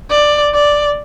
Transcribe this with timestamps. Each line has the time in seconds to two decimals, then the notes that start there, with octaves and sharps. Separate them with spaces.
0.11 D5
0.54 D5